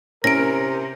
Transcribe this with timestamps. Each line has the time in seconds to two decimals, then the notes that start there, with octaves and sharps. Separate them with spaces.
0.24 C3 C#4 E4 A#4 A#6 D7